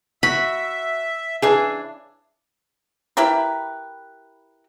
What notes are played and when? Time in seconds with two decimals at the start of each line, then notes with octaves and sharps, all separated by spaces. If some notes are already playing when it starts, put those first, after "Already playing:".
0.23 F#4 E5 B5
1.42 C#3 E3 D4 G#4 E5
3.17 E4 G4 A#4 B4